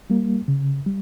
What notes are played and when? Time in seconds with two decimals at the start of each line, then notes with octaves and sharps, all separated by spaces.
0.10 G3 A#3
0.48 C#3
0.86 G3